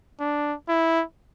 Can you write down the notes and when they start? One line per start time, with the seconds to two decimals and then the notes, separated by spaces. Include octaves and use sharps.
0.20 D4
0.69 E4